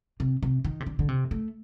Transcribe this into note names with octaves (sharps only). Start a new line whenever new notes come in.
C3
C3
D#3
C3
D3
D3
C3
A3